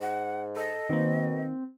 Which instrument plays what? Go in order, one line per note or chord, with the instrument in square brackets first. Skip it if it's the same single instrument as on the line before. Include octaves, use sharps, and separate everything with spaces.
[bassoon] G#2 [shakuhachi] F#5
[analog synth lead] A4 [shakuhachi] D#5
[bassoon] B2 [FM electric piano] D#3 A#3 [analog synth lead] C4